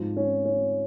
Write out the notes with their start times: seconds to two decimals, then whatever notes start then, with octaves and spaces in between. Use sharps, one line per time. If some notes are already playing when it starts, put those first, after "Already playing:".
Already playing: G#2 F3
0.17 C#4
0.45 C#4